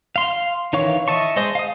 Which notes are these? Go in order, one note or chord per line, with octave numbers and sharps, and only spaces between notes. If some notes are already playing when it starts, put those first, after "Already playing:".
F5 C6
D#3 E3 C#5 F5 C#6
D#5 E5 A5 C#6
G#3 C5 D#5
F5 D#6